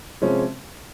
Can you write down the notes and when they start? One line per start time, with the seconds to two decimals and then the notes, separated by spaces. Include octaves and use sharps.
0.22 C3 F3 G#3 C#4